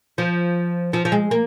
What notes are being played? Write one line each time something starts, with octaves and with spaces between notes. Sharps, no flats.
F3
F3
F3
G#3
A#3